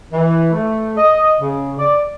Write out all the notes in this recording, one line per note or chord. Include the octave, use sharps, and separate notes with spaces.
E3
A3
D#5
C#3
D5